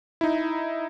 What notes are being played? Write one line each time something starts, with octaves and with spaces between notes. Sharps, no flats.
D#4 E4